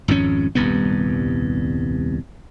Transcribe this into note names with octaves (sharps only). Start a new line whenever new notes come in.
G#1 F2 G#2 C#4
D#1 C2 G2 B3